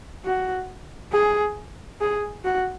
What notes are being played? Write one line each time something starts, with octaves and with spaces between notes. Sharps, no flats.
F#4
G#4
G#4
F#4